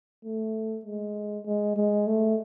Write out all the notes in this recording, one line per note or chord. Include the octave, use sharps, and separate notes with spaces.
A3
G#3
G#3
G#3
A3